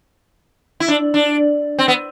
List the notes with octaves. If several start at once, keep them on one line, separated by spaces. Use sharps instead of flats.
E4
D4
D4
C4
B3